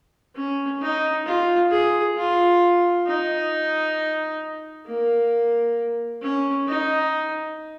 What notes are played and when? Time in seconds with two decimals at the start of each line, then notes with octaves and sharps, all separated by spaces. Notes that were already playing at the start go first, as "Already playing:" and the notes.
0.36 C#4
0.82 D#4
1.26 F4
1.71 G#4
2.17 F4
3.07 D#4
4.87 A#3
6.22 C#4
6.68 D#4